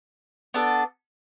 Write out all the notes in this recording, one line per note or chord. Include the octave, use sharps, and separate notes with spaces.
B3 D4 A4